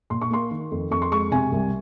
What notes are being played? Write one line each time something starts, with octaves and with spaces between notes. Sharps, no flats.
A#2 C6
C#6
A#3 C6
D#3
F2
F2 C#6
C6
G#3 C#6
C3 G#5
C2